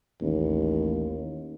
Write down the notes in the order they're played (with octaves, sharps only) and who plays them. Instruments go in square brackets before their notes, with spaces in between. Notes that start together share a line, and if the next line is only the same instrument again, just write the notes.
[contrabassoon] A1 [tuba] D#2